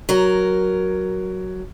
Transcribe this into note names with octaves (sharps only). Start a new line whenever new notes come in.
F#3 A#4